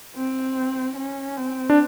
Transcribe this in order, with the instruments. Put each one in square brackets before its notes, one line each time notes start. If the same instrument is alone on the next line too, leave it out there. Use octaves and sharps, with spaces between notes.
[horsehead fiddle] C4
C#4
C4
[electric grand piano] D4